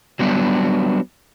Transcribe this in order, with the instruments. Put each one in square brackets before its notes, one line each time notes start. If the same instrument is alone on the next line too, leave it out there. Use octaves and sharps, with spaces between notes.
[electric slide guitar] F#3 G3 B3 D4